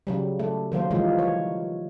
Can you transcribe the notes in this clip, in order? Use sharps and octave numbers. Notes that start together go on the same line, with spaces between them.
C#3 F#3 G3
A3
D#3 F#3 A#3 C5
E3 F3 G3 G#3 A#3
C#5